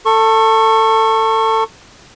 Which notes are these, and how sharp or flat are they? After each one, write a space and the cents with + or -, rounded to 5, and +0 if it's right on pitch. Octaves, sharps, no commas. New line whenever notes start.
A4 +20 C#6 -20